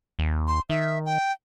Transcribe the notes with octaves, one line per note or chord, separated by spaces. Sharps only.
D#2
C6
D#3 E5
G5